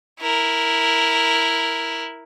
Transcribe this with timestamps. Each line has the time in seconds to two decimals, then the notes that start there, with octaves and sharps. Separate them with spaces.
0.20 E4 A#4